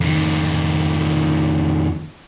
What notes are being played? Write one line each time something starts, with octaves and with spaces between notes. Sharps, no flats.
F2 D#3